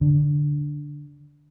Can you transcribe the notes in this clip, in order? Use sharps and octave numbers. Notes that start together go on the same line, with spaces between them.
D3